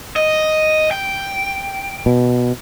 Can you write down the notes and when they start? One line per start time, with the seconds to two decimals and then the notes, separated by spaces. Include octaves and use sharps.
0.16 D#5
0.91 G5
2.06 B2